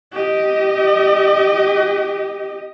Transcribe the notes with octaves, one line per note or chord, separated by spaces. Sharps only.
G4 D#5